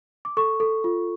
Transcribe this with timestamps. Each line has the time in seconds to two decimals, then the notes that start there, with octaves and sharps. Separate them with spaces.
0.25 D6
0.37 A4 C#6
0.60 A4
0.84 F4